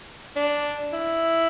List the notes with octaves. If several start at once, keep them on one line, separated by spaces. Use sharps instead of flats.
D4
E4